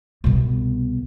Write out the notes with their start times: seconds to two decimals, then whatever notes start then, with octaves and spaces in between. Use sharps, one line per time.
0.24 C2 B2